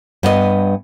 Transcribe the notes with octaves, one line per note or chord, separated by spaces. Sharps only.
G2 B3 B4 D#5